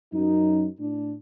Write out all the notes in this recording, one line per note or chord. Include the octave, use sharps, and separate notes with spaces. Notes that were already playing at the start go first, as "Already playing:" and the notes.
F#2 D#4
A2 D4